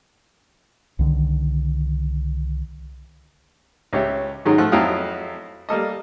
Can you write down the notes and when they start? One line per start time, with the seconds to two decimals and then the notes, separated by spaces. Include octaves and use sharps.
0.99 C2 D3 D#3
3.93 C#2 C#4 G4 C#5 E5
4.45 G#2 D#3 F#3 G#3 C#4 D#4
4.58 F3 A3 F#5 F#6
4.72 F2 F#3 E4 F5 G5 D#6
5.69 G3 A#3 A4 D#5